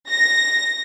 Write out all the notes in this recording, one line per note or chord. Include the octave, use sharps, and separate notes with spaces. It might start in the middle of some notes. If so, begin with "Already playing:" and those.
A#6